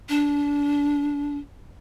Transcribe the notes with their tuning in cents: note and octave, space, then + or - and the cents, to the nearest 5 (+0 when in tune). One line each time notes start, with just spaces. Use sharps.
D4 -25